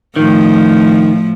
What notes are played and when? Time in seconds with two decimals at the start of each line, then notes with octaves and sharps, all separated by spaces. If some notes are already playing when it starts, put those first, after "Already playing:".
0.16 A2 D#3 F3